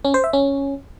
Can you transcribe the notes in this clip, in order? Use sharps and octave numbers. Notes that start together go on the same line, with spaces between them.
C#4
C5
E5
C#4